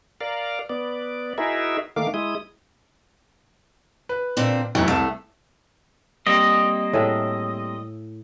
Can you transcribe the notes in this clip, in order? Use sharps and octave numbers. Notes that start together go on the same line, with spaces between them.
A#4 D5 F5
B3 D5
D#4 E4 F#4 G#4 A#4 E5
D#3 A3 A#3 F5 D6
G#3 E4 D#6
B4
A#2 D3 C4
F1 E2 F#3 E4
C2 A3 A5 E7
G3 A#3 C4 D#5
A2 G#4 E5